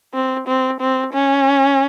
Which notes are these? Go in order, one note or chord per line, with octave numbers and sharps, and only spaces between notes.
C4
C4
C4
C#4